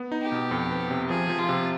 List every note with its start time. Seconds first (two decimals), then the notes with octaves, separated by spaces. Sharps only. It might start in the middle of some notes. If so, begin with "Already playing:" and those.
Already playing: B3
0.12 D#4
0.22 G4
0.32 B2
0.51 F2
0.71 B3
0.91 C3
1.09 F3 G#4
1.29 F3
1.39 F4
1.49 C3